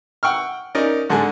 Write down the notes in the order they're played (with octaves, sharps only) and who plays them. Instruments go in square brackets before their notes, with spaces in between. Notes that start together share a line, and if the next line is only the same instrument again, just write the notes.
[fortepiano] F#5 G5 C#6 E6 F6
C#4 D#4 A#4 D5
G#2 D3 G#3 A4 G#5